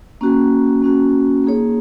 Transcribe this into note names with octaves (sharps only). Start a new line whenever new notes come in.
A#3 C#4 F#4
A#3 C#4 F#4
A#3 D#4 G#4 C#5